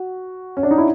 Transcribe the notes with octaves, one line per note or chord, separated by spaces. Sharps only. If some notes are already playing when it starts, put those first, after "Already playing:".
Already playing: F#4
C#4
D4
D#4
E4